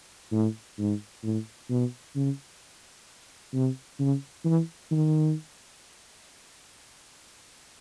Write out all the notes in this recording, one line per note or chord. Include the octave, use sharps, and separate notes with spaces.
A2
G#2
A2
B2
C#3
C3
C#3
E3
D#3